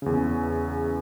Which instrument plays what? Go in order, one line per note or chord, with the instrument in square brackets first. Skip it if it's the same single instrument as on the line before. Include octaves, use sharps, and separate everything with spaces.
[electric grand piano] E2 C#3